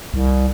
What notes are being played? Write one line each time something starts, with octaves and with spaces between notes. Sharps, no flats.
C2